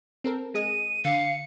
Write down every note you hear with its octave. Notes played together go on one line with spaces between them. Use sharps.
C4 A4 A#4
G#3 G#4 D#5 D#7
D3 F5 C#7